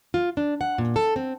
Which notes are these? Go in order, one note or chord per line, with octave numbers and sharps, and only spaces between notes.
F4
D4
F#5
A#2
A4
C4